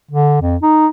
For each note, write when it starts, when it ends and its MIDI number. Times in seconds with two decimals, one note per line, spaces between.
0.11 0.39 50
0.41 0.57 41
0.62 0.87 63